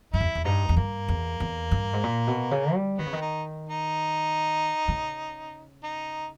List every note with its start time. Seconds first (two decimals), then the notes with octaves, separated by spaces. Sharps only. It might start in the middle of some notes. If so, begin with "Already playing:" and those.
0.13 G2 E4
0.21 E2
0.35 E2
0.45 G2 D#4
0.69 E2
0.77 G2 A#3
1.08 E2
1.40 E2
1.71 G2
1.93 G#2
2.03 A#2
2.27 B2
2.51 C#3
2.74 G3
2.98 D#3 B3
3.06 C#3
3.13 D#3
3.21 D#4
3.70 D#4
4.88 C#3
5.83 D#4